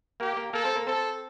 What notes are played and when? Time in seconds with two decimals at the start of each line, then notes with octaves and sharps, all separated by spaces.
0.20 A#3 G4 A#4
0.37 A#3 A#4
0.53 A#3 A4 A#4
0.65 C4 C5
0.75 A#3 A#4
0.87 C4 A4 C5